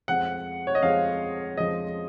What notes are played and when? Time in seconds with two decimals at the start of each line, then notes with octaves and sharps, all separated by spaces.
0.08 F2 F3 G#3 F#5
0.67 C#5
0.75 D#5
0.82 F2 F3 G#3 F5
1.57 F2 F3 G#3 D#5